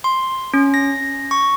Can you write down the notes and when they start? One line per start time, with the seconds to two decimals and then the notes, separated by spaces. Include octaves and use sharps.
0.04 C6
0.54 C#4
0.74 A#6
1.31 C#6